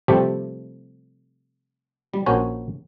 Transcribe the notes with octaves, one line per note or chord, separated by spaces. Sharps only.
C3 F3 G3 A3 C4 G4
G3
A#1 A#3 C#4 F#4 C5 G#5